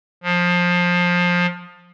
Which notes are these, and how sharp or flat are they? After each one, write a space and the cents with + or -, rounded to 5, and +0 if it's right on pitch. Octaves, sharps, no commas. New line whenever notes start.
F3 +20